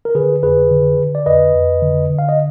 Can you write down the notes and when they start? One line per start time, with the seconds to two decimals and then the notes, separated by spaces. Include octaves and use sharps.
0.05 A#4
0.15 D3 G#4 B4
0.43 F2 G#4 B4
0.71 D3
0.99 D3
1.15 D5
1.26 F2 B4 D#5
1.55 F2
1.82 D3
2.10 D3
2.19 F5
2.29 D#5